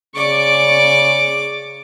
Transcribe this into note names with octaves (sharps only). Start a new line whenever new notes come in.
C#3 D5 C#6 D6